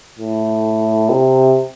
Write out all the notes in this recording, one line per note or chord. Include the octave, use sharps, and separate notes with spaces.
A2
C3